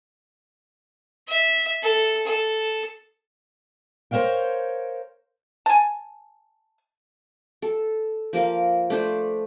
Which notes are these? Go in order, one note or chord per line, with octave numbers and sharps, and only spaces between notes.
E5
A4
A4
A#4 C5 C#5 F5 G5
G#5 A5
A4
F3 A#3 A#4 F5
A3 D4 C5